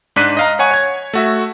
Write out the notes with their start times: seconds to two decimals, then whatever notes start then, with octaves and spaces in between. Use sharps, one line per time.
0.16 G#2 D4 F#6 B6 D#7
0.37 D#5 F5 A#5
0.59 C#5 F#5 G#5 C#6
0.71 C#5 G#6
1.13 A3 F#4 E5